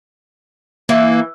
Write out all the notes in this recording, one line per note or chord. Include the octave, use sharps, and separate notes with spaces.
E3 A#3